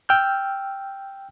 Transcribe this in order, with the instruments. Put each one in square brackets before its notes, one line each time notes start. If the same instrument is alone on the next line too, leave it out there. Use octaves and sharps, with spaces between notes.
[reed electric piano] G5 E6 F6 G6